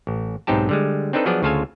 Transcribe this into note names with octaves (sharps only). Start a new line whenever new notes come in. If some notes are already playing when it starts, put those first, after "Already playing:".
A1
B1 G#2 C4 D#4 G4 A5
D3 G3 G#3
C4 D4 D#4 A4 B4
F3 F#3 B3 D4 G#4 D5
D2 C#3 F4 A4 F5 G#5